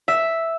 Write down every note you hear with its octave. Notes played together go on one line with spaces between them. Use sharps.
E5